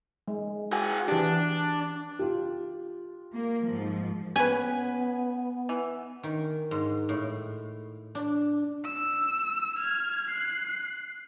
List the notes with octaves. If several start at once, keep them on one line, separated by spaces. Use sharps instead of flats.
G#3
F#4 G#4
E3 D4 G4
F4 G4
A#3
G#2 F3
B3 C#4 B4 G#5
E3
D#3
G#2
A2
D4
E6
F6 G#6
F#6 C7